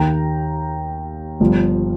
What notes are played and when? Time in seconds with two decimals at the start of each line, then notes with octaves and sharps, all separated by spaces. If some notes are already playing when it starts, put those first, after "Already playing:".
Already playing: D#2 D#3 A#3 G5 A#5
1.40 G1 G2 F3